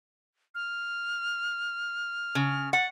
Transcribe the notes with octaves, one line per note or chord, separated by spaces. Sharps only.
F6
C#3
F#5 A6